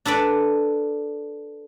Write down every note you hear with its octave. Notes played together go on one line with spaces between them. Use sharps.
D4 A4 B4 D5